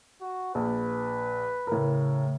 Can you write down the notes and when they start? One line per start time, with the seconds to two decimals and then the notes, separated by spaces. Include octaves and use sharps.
0.21 F#4
0.55 A#1 B4
1.67 A2 C#3 A#4